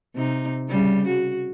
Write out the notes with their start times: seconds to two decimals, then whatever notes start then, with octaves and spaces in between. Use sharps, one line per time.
0.15 C3 D#4
0.69 C#3 G3
1.07 F#4